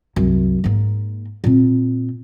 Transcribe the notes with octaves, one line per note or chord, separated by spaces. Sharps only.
C2 F#2
G#2 A#3
A#2 C4